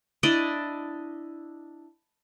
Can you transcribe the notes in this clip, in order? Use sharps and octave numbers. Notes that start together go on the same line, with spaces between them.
D4 E4 D5 D#5